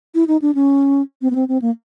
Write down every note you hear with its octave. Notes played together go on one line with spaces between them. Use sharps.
E4
D#4
D4
C#4
C4
B3
C4
C4
A#3